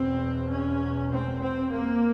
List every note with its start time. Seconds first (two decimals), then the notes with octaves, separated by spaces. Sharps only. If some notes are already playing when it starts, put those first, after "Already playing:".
Already playing: E2 B2 C4
0.49 C#4
1.09 C4
1.40 C4
1.71 A#3